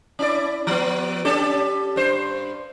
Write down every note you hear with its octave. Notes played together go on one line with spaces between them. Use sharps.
C#4 E4 D5
F3 B3
C#4 G4 A4
G2 C5